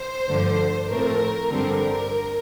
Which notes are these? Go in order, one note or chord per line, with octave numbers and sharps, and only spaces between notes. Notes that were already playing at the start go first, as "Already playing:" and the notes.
Already playing: C5
G2 D3 F3 A3
A2 F3 A3 C4 A#4
G2 D3 G3 C4 A#4